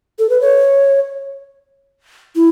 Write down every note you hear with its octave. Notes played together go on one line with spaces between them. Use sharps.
A4
B4
C#5
E4